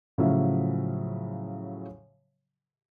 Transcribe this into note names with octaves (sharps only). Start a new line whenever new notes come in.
A2 C#3 F3 F#3 E5 F5